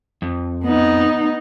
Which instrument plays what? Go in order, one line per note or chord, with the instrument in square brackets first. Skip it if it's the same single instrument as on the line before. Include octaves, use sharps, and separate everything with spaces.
[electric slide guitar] F2
[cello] B3 D#4